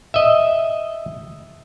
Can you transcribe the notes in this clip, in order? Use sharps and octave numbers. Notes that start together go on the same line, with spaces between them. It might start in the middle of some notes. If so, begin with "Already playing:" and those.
D#5 E5